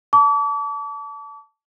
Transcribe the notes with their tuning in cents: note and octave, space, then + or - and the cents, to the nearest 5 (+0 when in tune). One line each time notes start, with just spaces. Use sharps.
A5 +0 D6 -40